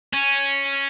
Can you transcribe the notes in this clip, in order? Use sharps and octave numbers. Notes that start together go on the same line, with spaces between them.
C#4